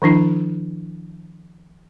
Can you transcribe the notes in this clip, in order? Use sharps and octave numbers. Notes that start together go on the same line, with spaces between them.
D#3 F3 D4 E4